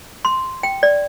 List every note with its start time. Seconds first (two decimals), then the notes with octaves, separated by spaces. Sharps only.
0.25 C6
0.63 G5
0.83 D5